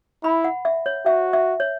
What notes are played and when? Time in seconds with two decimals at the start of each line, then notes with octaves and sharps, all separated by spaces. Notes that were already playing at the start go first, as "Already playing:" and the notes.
0.24 E4 B5
0.44 F#5
0.65 E5
0.86 C#5
1.05 F#4 E5
1.33 E5
1.60 C#5